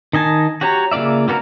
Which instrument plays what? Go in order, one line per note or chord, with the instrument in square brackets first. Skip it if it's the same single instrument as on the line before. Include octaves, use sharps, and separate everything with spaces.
[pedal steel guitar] D#3 D#5 G#5 A5
F#4 G4 C#5 A#5
C#3 A#3 F4 D5 E5
A#3 B3 F#4 A4 A#4